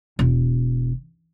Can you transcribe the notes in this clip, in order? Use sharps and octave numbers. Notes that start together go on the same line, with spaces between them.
E1